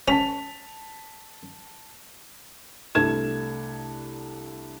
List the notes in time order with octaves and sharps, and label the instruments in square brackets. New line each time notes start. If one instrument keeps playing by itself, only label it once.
[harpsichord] C#4 [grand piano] A5 B6 F7
[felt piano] C2 A3 D4 G#6 E7